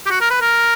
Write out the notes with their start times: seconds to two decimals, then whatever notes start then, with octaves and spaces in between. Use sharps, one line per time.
0.06 G4
0.10 F#4
0.21 A#4
0.30 B4
0.41 A#4